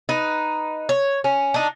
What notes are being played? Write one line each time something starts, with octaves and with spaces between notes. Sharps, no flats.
D#4 B4
C#5
C#4
D4 D#4